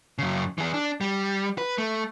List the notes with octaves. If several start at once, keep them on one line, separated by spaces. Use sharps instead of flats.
F#2 C#3
E3 G#4
D4
G3
B4
A3